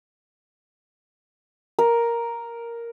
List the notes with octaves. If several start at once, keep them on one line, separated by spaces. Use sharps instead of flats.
A#4